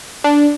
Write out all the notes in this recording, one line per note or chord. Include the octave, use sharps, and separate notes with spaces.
D4